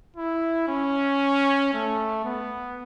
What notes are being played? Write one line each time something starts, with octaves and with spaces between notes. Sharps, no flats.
E4
C#4
A3
B3